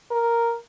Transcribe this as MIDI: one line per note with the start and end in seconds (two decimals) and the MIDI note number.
0.11 0.56 70